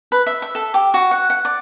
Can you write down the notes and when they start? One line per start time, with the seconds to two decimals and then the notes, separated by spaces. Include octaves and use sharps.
0.12 B4
0.27 E5
0.42 E5
0.55 A4
0.74 G4
0.94 F#4
1.11 F#5
1.30 F#5
1.45 D5